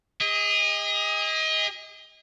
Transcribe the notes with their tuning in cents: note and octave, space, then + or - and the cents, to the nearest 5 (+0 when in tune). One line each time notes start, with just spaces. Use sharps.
G#4 -35 D#5 +25